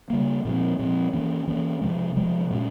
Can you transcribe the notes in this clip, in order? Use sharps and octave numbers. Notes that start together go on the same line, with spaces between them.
C#3 G3 A#3
A#2 F3 C4
A#2 F3 C4
E3 A#3 C#4
E3 A#3 C#4
C3 F3 G#3
C3 F3 G#3
A#2 G#3 C#4